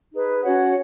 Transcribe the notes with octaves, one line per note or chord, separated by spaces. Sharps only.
D#4 G#4 B4
C#4 F#4 C#5 F#5